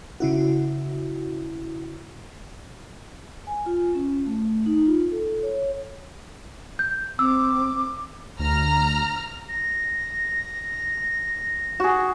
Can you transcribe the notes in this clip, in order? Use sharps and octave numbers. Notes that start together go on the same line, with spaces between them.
C#3 E4 F#4
G#5
F4
C#4
A3
D#4
F4
A4
C#5
G6
C4 D6 E6
D2 A#5 F6
A#6
F#4 G#4